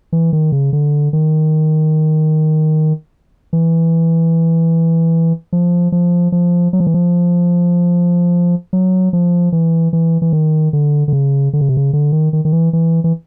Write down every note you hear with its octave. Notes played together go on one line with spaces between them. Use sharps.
E3
D#3
C#3
D3
D#3
E3
F3
F3
F3
F#3
F3
E3
F3
F#3
F3
E3
E3
E3
D#3
D3
D3
C#3
D3
C#3
C3
C#3
D3
D#3
D#3
D#3
E3
E3
E3